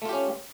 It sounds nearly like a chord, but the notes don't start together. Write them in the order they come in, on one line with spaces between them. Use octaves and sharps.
A3 F4 G4 C#4